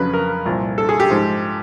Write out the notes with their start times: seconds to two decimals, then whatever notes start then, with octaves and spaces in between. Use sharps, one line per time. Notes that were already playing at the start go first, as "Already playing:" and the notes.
Already playing: F2 C#3 F#3 B4
0.13 A#4
0.46 C2 A#2 F3
0.78 A4
0.89 G#4
1.00 G4
1.10 G#2 F3